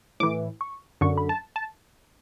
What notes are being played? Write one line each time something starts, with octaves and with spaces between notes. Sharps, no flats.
A2 E3 D6
C#6
F#2 D3 C#6
B5
A5
A5